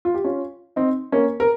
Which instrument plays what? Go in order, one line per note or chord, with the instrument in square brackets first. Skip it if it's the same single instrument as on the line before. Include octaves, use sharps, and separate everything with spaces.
[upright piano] F4
G4
C#4 F4
C4 D#4
A#3 C#4
A#4